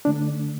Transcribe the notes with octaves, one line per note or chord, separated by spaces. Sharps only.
D3 A3 D4